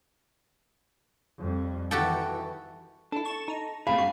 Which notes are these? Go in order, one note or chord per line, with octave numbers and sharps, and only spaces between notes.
F2 G3
D#3 E3 F#4 G4 A4
D4 E4 A4
A5 C#6 E7
D#4 A#5
A#2 C#3 A3 C4 G#4 F5 B5
G2 F#4 C7